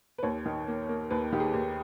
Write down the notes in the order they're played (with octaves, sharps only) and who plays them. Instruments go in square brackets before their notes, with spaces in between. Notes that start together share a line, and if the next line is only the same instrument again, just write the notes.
[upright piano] B4
D#2 C#5
D#3
A#3
A#3
D#2 B4
D#3 G4
G#4
D#2